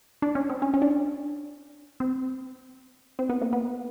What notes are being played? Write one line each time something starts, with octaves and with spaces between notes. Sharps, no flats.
D4
C#4
C4
C#4
C#4
D4
C4
C4
B3
A#3
B3